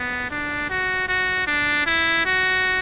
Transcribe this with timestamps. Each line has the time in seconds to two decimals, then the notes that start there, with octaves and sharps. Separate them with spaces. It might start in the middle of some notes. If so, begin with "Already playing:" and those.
Already playing: B3
0.30 D4
0.70 F#4
1.09 F#4
1.47 D4
1.86 E4
2.25 F#4